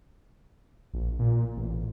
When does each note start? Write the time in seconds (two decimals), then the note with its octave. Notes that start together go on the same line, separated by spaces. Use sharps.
0.93 A#1
1.19 A#2
1.57 A1